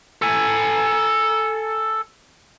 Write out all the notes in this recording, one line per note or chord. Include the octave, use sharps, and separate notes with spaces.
A4 G#5